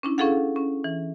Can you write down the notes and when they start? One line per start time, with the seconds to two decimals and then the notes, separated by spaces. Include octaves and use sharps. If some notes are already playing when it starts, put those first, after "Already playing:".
0.03 C#4 D4 E4
0.18 C#4 E4 G#4 A4 F5 F#5
0.56 C#4
0.84 E3